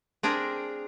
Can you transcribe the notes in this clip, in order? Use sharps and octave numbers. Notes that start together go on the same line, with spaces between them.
C4 D4 G#4 A#4